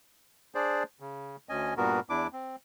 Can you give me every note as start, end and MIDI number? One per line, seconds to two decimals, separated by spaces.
0.55 0.83 62
0.55 0.83 68
0.55 0.83 72
0.55 0.83 74
1.00 1.36 49
1.49 1.74 38
1.49 1.74 61
1.49 1.74 75
1.49 1.74 80
1.77 2.00 43
1.77 2.00 46
1.77 2.00 59
1.77 2.00 66
1.77 2.00 70
2.09 2.27 40
2.09 2.27 62
2.09 2.27 64
2.09 2.27 86
2.33 2.56 60